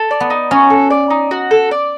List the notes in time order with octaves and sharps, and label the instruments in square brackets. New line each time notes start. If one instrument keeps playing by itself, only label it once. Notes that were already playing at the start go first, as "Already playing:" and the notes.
Already playing: [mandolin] A4
D5
[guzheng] B3
[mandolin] D#4
[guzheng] C#4 [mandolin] F#4
[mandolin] A4
D5
D#4
F#4
A4
D5